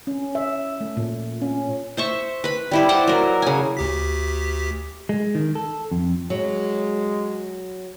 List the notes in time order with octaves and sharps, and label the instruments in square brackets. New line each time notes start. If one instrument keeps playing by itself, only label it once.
[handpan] C#4
E5
A3
A#2
C#4
[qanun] C5 E5 C#6
B4 B5
G3 E4 G4
C5 D5 F#5
F#3 A#4
C#3 G#5
[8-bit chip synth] D2 G4 B6
[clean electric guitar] G#3
D#3
A4
F2
[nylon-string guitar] F#3 [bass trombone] G#3